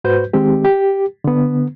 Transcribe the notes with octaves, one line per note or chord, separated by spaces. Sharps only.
G#2 F#4 B4 C5 G6
D#3 G#3 C4 G4
G4
D3 B3